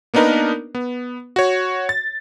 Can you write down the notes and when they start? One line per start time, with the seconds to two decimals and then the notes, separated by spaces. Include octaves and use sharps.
0.14 A#3 B3 D4 D#4 A#4 B4
0.75 B3
1.36 F#4 C#5
1.89 A6